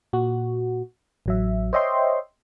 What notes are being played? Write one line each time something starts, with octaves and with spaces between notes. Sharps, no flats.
A#2 F#4
A1 F#3 E5
C5 C#5 D#5 E5 G5 C6